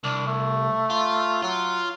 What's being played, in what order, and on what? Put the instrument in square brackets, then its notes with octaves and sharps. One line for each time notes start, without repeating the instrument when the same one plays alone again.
[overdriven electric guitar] C2 [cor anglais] D4
[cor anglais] A3
[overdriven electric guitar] F4
[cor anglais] F#3 [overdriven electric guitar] F4